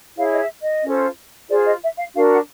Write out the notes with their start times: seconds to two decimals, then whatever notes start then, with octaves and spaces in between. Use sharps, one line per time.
0.16 E4 G#4 C#5 F5
0.31 D#5
0.38 E5
0.61 D#5
0.83 C#4 F4 A4 C5
1.49 F4 G#4 C5 D5
1.65 D#5
1.82 E5
1.98 F5
2.15 D4 F#4 A#4 F5
2.31 F#5